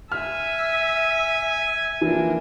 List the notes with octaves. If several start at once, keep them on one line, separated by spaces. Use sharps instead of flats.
E5 G#5 F6
E3 F3 A#3 D4